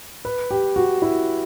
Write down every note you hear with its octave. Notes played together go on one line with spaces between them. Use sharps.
B4
G4
F#4
E4